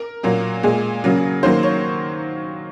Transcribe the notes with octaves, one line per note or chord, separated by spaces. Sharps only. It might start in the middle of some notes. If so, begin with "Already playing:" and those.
Already playing: A#4
A#2 F#3 A#3
A#2 G#3 G#4
C#3 F#3 A#3
D#3 F#3 A#3 C5
C#5